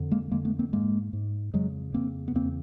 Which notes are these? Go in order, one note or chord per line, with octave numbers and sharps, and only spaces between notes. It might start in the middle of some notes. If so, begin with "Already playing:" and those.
Already playing: F2 D3
G#3 A#3
F2 D3 G#3 A#3
A3 B3
A#3 C4
G#2 G#3 A#3
G#2
F2 C#3 F#3 G#3
F2 C#3 A#3 C4
B3
E2 C#3 A#3 C4